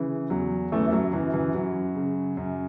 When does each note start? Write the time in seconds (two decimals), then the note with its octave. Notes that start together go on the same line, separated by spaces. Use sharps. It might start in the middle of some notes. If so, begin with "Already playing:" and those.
Already playing: C#3 E3
0.30 E2 F#3
0.72 F#2 E3 A3
0.88 A3
0.92 F#3
1.13 F#2 E3
1.33 E3
1.54 F#2 F#3
1.95 C#3
2.37 F#2